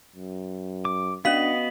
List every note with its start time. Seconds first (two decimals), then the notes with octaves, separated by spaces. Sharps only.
0.16 F#2
0.85 D6
1.25 B3 C#4 D4 F#4 D#5 F5 B6 F#7